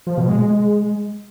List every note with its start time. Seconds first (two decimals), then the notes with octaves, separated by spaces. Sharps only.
0.07 F3
0.18 B2
0.28 G#3
0.39 G#3